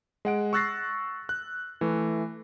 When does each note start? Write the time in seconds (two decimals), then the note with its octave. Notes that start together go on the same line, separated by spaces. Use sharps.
0.25 G#3 F#5 D7
0.53 C#6 E6 F#6 A6 A#6 C7
1.29 F#6
1.81 E3 A3